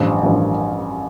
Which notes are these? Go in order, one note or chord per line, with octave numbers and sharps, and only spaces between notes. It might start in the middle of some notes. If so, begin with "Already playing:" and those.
Already playing: A1 G2 F3
A1 G2 F3